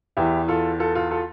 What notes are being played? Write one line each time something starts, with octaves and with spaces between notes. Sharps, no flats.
E2 E3 E4 G4
F4 A4
F4 A4
F4 A4
F4 A4